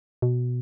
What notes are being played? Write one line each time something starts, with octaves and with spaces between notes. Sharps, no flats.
B2